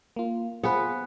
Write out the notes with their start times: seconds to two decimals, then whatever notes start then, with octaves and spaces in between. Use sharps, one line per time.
0.16 A#3 F4
0.63 B3 F4 G#4 B4 C5